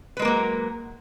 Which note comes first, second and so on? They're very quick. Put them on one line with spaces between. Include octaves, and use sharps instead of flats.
B4 G#3 A#4 A#3 F#3